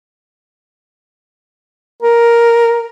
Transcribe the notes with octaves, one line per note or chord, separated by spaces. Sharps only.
A#4